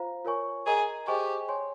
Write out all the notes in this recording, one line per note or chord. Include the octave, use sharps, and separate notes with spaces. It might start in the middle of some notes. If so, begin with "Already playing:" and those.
Already playing: F4 C5 F5 A#5
F4 A#4 C#5 G#5 C#6
G#4 A#4 D#5 A#5
G4 G#4 C5 D#5 G#5 C#6
C#5 G#5 C6